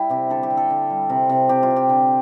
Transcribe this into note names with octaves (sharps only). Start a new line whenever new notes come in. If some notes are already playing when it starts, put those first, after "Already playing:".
Already playing: G3 E4
C3 G4
D3 A4
G4
D3
A4
D3
G3
C3
C3
C3 G4
F4
C3
G4
D3